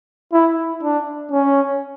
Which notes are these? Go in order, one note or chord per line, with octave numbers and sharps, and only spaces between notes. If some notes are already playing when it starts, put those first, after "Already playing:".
E4
D4
C#4